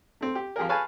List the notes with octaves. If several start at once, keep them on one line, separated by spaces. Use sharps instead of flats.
A3 C4
G4
F3 G4 G#4 A#4
G#4 B4 C#5 F5 G#5 A5